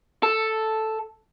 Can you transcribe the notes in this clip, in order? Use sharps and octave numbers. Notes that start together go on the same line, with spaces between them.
A4